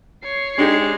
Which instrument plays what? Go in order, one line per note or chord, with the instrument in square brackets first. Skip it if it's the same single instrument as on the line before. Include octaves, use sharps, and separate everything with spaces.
[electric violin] C#5 C7
[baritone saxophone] G#3 [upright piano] D4 D#4 G4